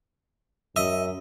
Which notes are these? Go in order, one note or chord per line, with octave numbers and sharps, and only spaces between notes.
F#2 D#5 E5